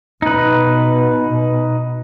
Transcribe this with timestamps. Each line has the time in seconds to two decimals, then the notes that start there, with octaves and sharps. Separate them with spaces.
0.22 B2 D#4 B4